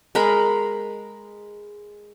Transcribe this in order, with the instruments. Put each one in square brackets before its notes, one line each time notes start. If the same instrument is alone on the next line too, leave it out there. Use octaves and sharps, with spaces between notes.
[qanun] G#3 A#4 B5